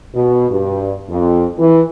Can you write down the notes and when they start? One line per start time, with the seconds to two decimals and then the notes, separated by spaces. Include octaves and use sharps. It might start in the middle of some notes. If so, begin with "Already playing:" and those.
0.14 B2
0.50 G2
1.10 F2
1.58 E3